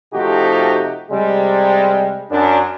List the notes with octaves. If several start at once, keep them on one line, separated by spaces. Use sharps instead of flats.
C3 F3 A3 D#4 F#4 G4
C3 G3 G#3
F#2 D4